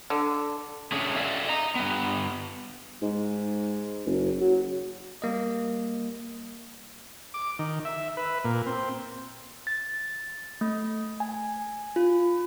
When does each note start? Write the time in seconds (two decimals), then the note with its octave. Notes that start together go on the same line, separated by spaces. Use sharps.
0.10 D3
0.92 D3 A3 C#4 G#4
1.16 A4 D5 E5 F5
1.48 D#5 A#5
1.75 G2 B3
3.02 G#2
4.06 F#1
4.41 F#3
5.22 G3 A#3 D#5
7.34 D6
7.59 D#3
7.85 E5
8.17 B4
8.44 A#2
8.67 C4
9.67 A6
10.61 A3
11.20 G#5
11.96 F4